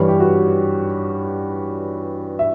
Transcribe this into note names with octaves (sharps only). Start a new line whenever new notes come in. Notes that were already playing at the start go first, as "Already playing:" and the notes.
Already playing: G2 E3 G3 C#5
G4
F#4
E5